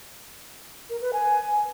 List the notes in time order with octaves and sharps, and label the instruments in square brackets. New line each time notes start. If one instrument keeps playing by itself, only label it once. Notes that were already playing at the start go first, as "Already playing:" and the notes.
[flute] A#4
B4
G#5